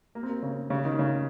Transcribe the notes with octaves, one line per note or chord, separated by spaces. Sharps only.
A#3
C4
A#3
C#3
C#3
D#3
C#3